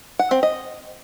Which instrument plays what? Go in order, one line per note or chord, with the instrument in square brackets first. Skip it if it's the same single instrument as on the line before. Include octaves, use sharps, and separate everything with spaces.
[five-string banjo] F#5
C4
D#5